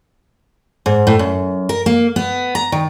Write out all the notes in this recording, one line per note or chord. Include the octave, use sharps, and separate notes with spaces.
G#2
A2
F#2
A#4
A#3
B3
A#5
D#3